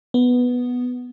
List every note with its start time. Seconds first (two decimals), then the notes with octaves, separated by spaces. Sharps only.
0.14 B3